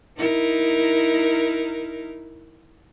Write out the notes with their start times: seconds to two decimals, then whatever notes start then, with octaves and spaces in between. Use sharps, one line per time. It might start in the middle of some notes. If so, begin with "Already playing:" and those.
0.17 D#4 E4 A#4